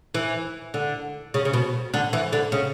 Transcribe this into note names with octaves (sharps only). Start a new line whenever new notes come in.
E3
D3
C#3
C#3
B2
D3
E3
D3
C#3